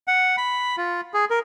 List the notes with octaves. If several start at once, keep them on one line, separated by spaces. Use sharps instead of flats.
F#5
B5
F4
G#4
A#4